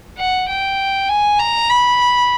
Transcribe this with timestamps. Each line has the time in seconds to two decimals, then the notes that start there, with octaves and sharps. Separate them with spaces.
0.18 F#5
0.48 G5
1.09 G#5
1.39 A#5
1.70 B5